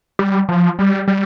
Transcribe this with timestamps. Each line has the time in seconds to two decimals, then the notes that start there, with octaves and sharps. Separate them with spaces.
0.19 G3
0.49 F3
0.79 G3
1.08 G3